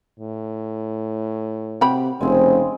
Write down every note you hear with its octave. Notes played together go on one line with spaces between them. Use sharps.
A2
C3 F#4 G4 B5
F1 C#3 G#3 C4